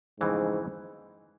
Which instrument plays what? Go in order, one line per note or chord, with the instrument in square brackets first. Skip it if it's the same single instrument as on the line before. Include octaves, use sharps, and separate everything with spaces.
[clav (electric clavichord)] F2 C#3 E3 A3 C4 [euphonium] G#2